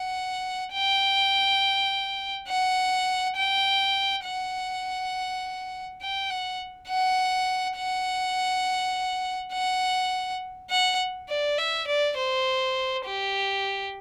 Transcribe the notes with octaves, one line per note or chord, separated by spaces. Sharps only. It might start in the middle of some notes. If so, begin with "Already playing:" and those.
Already playing: F#5
G5
F#5
G5
F#5
G5
F#5
F#5
F#5
F#5
F#5
D5
E5
D5
C5
G4